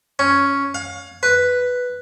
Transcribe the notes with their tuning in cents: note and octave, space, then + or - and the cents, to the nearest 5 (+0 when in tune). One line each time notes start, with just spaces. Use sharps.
C#4 +5
F5 +35
B4 +0